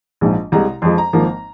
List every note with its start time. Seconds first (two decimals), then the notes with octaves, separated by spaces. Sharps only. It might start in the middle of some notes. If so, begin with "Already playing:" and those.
0.21 A#1 G#2 F3
0.52 C2 C3 G#3 A#5
0.82 F2 F3 G#3 C6
0.98 A#5
1.13 G#1 G#2 F3 A#3